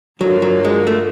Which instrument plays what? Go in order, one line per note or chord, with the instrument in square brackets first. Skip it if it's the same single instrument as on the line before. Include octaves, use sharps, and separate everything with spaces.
[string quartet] G2 D3 F3 A#3 [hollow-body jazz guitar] F#3
[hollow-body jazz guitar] F#3
G#3
A3